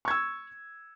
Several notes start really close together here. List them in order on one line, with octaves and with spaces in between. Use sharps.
C#6 G#6 E6